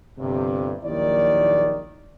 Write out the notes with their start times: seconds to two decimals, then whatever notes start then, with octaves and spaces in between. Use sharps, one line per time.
0.18 G1 G2 C3
0.84 A#1 D#2 D#3 F#3 E4 D5